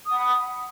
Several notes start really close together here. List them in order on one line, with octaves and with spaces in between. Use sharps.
D#6 F#5 B5